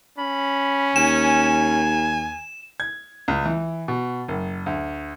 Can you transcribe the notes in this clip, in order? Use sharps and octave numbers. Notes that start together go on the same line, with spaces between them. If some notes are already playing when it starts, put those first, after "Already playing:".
C#4 B5
D#2 G#5 E7
G#6
C#2
E3
B2
F#1
D2